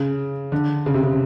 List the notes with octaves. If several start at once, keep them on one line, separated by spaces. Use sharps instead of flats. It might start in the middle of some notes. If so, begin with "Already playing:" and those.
Already playing: C#3
D3
C#3
C3
C#3